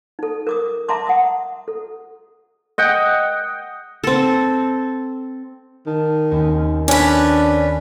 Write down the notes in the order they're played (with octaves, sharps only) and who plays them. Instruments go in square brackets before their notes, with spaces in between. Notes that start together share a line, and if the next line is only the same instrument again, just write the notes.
[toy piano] D#4 A4
A#4 D6 D#6
E5 A5 A#5 C6 D6
F#5 D#6
A4
[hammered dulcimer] D#5 F#5 G5
[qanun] C4 A4
[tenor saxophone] D#3 [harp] A5
[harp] D#2 C4 C#4
[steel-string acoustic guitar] C#4 B4 [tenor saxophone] D4 [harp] G#6